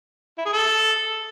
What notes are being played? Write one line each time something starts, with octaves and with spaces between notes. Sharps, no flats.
E4
G#4
A4